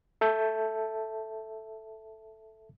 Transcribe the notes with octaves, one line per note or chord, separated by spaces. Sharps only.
A4 E5 A5 G6